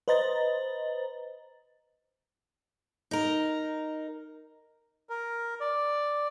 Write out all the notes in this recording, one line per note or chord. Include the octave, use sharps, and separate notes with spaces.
B4 C5 D#5 A#5 A6
D#4 A#4
A#4
D5